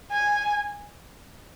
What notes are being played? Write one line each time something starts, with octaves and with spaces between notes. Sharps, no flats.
G#5